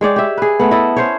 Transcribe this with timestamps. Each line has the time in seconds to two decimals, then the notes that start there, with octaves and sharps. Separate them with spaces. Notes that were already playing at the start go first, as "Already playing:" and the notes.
0.01 G#3 C#5 D5 G5
0.16 G4 E5
0.37 G#4 B4
0.60 A3 B3
0.71 E4 A4 D#5 E5
0.97 C#4 C5 C#5